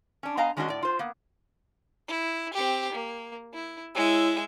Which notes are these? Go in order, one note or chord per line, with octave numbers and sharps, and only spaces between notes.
C#4 D4
B3 D#5 F5 G#5 A#5
D#3 G#3 C#4 D4 F#4 D#5
A2 D5
F4 C5
A#3 B3
E4
C4 G4
A#3
E4
G#3 E4 C#5 E5 E6